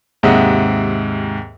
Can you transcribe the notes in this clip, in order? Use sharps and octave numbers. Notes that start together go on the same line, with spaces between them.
D#2 G#2 C3 D#5 E5 F#5